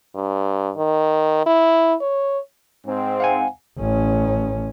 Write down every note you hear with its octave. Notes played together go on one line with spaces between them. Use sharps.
G2
D#3
E4
C#5
G#2 C4
F5 F#5 G#5
A1 C#4